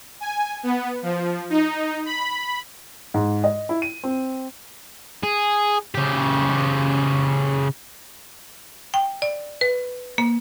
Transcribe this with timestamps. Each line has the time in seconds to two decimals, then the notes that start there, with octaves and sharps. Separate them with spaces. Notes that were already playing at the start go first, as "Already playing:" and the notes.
0.20 G#5
0.63 B3
1.02 F3
1.50 D#4
2.06 B5
3.14 G#2
3.44 D#5
3.69 E4
3.82 D#7
4.03 C4
5.23 G#4
5.95 C#3 G4
8.94 G5
9.22 D5
9.61 B4
10.18 A#3